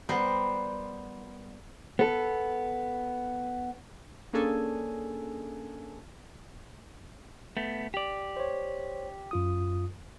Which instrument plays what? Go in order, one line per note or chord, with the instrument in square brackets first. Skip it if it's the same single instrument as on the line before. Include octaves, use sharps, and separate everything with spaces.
[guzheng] G3 B3 A#4 C5
[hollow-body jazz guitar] B3 A4
[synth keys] A#3 C#4 D4 G#4 A4 G#5
[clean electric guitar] A3 B3
G4 D5
[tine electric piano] C5 C#5
F#2 F4 D#6